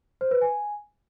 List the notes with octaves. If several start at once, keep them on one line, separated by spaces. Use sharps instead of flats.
C5
B4
G#5